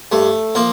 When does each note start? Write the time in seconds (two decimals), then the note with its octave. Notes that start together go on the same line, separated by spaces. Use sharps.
0.12 G2 A3
0.55 F3 A#3